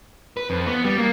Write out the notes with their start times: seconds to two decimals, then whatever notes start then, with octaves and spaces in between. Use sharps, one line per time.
0.37 B4
0.50 F2
0.67 B3
0.84 G3
0.98 A#3